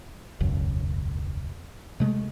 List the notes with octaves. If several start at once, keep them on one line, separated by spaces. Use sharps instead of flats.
E1 C#2 F#2
C3 G#3 A3